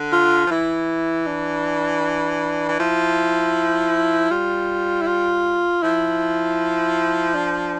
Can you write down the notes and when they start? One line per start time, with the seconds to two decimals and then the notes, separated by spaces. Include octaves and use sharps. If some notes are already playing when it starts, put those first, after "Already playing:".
Already playing: D3
0.13 F4
0.47 F3
0.51 E3 E4
1.27 D4
2.68 E3
2.79 F3 E4
4.31 G3 F4
5.02 E4
5.07 F4
5.83 F3 E4
7.35 D4